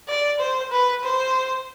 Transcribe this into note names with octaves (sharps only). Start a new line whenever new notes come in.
D5
C5
B4
C5